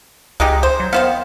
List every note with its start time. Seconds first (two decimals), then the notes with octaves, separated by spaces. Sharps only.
0.40 C#2 G#3 D#4 G4
0.63 C5
0.80 F#3
0.93 D#3 B3 C5 F5